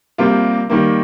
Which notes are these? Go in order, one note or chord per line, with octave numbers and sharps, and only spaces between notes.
C3 G3 A#3 F4
D#3 G3 A#3